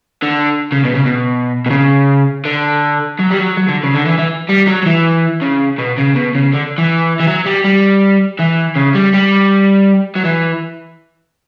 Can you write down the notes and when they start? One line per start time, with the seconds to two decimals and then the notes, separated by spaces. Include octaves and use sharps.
0.23 D3
0.72 C#3
0.85 B2
0.95 C#3
1.06 B2
1.66 B2
1.70 C#3
2.45 D3
3.19 F#3
3.30 G3
3.39 F#3
3.57 F#3
3.68 D3
3.83 C#3
3.93 D3
4.06 E3
4.19 E3
4.49 G3
4.68 F#3
4.83 F#3
4.86 E3
5.42 C#3
5.79 B2
5.98 C#3
6.16 B2
6.35 C#3
6.53 D3
6.78 E3
7.20 E3
7.28 F#3
7.46 G3
7.65 G3
8.39 E3
8.76 C#3
8.94 G3
9.14 G3
10.16 F#3
10.25 E3